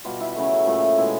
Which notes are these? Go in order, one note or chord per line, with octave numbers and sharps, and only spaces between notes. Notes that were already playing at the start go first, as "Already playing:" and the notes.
B2 G3 F4
E4
C#3 F#3 A3
A#2 F3 A3
B2 G#3 E4